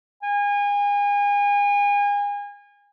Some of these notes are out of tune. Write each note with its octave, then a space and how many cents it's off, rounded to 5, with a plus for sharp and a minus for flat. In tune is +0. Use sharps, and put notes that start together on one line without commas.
G#5 -35